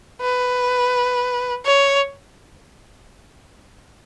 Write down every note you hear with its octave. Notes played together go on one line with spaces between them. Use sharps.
B4
C#5